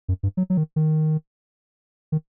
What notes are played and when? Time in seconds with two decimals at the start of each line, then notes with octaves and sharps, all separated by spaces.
0.08 F#2
0.23 G2
0.37 F#3
0.50 F#3
0.57 D#3
0.76 D#3
2.12 D#3